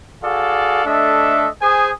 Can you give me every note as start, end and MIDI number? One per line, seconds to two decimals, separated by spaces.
0.23 0.85 66
0.23 0.85 68
0.23 0.85 69
0.23 0.85 74
0.23 0.85 77
0.85 1.48 57
0.85 1.48 62
0.85 1.48 69
0.85 1.48 75
0.85 1.48 76
1.62 1.92 68
1.62 1.92 72
1.62 1.92 80
1.62 1.92 87